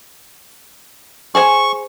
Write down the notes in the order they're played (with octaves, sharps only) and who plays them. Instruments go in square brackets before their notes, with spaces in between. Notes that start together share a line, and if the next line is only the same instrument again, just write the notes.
[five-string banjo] G#4 C5 G#5 [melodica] C#6